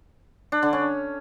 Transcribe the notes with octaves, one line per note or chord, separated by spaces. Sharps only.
D4
D3
C#4